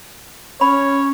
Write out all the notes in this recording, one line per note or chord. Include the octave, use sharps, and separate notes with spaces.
C#4 C#5 B5